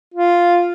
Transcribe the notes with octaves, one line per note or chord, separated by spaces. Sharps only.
F4